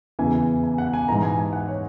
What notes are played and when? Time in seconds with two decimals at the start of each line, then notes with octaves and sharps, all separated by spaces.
0.19 E2 C#3 E3 G#5
0.64 G#5
0.78 F#5
0.94 G#5
1.08 G#2 E3 A#5
1.23 G#5
1.38 G#5
1.53 F#5
1.68 C#5